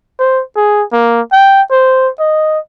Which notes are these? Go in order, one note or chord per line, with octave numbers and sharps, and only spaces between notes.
C5
G#4
A#3
G5
C5
D#5